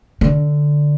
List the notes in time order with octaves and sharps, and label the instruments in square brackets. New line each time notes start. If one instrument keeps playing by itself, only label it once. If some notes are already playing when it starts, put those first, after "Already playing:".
[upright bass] D3